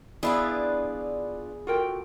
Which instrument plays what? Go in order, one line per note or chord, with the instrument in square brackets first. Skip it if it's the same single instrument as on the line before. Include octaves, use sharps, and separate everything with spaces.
[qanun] B3 E4 [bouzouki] D4 F4 B4 [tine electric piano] G#4
[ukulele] F4 A#4 G5 [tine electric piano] F#4 A4